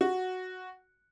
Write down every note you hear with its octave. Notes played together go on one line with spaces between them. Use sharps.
F#4